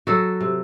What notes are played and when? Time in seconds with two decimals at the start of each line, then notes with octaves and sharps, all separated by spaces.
0.07 F#3 F#4 A4
0.41 C3